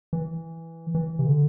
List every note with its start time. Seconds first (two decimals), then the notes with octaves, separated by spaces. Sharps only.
0.13 E3
0.95 E3
1.19 C3
1.26 D3